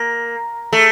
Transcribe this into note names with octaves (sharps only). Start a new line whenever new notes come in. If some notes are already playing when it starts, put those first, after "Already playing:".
Already playing: A#3
A3